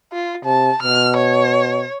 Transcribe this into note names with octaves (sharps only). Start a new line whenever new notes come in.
F4
C3 A5
B2 F6
C#5